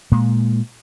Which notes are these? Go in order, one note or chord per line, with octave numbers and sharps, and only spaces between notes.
A#2 G#3 A#3